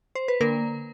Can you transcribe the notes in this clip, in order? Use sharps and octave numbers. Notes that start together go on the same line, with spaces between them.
C5
B4
D3 A#3 A#4